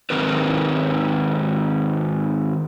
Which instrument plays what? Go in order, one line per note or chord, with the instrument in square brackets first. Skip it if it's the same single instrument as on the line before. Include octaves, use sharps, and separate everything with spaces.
[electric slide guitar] G#2 D#3 C4 A#4 B4